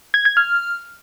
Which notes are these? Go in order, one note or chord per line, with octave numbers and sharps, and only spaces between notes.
G#6
G#6
F6